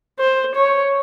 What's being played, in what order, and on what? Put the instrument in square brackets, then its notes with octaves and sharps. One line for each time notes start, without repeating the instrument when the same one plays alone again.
[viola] C5
C#5